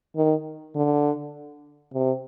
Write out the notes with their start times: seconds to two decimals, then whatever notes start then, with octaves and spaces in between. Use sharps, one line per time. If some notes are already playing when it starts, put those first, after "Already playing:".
0.16 D#3
0.76 D3
1.93 C3